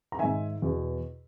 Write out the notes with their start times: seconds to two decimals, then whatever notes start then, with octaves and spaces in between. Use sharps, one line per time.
0.12 A#5
0.19 G#2 D#3 E5 G#5
0.62 E2 B2